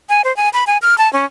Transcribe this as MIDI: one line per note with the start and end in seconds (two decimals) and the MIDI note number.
0.09 0.22 80
0.25 0.35 72
0.37 0.49 80
0.53 0.64 83
0.67 0.78 80
0.82 0.97 89
0.98 1.11 81
1.13 1.25 61